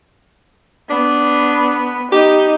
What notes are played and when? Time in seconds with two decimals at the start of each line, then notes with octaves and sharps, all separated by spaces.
0.90 B3 D4
2.12 D#4 G4